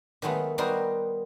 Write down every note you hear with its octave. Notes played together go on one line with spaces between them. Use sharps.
D#3 F#3 G#3 A3 B3
G3 B3 D#4 F#4 A#4 C5